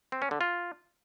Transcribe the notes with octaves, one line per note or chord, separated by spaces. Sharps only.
C4
C#4
D3
F4